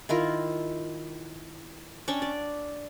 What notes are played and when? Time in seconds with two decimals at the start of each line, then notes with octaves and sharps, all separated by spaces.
0.09 D#3 E4 F4 A#4
2.08 C#4 D4 G5 C#6
2.22 D5